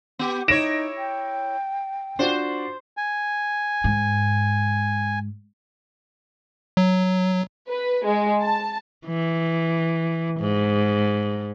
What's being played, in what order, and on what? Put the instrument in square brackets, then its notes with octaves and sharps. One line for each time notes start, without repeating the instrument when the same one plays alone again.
[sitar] B3 G4
[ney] D#4 [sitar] E4 C#5 [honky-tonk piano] A#6 D7 E7
[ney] G5
[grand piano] D4 F4 F#4 [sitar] C5
[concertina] G#5
[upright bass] G#2
[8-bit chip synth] F#3
[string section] B4
G#3
A5
[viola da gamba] E3
G#2